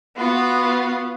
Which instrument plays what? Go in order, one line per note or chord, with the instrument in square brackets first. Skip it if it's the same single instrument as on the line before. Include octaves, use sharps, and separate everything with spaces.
[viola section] B3 [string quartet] F4 F#4